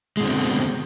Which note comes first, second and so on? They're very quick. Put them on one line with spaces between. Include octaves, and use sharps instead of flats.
G#3 B2 D3 C4